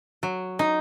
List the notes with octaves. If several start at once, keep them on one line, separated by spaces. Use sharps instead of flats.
F#3
D#4